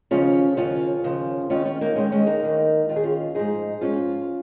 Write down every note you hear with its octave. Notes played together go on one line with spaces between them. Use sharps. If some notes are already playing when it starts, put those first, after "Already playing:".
D#2 C#3 F3 C#4 F4
D#2 C#3 F3 C#4 F4
D#2 C#3 F3
D#2 D#3 C#4 F4
C#4 F4
A#3 D#4
D#2 D#3 G#3 C#4
G#3 C#4
A#3 D#4
D#2 D#3
D#2 D#3 F4
G#4
C#4 F4
G#2 F3 D#4 G#4
G#2 F3 C#4 F4